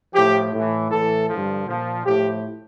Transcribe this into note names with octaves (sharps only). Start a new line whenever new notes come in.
A2 F3 G4
A2 E3
A2 E3 A4
G2 D3 F3
A#2 F3
A2 F3 G4